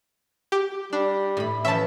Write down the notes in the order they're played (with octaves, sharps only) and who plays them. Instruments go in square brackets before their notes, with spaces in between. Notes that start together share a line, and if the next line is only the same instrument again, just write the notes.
[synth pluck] G4
[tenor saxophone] G3 [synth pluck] D4
[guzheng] A2 B5
[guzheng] E3 F3 [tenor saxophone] C#4 [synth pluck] E5 A5